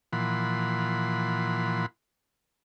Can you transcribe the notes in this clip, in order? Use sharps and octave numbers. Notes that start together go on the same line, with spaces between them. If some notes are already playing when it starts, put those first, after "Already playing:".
A#2 E3 F3 F#5 B5 C6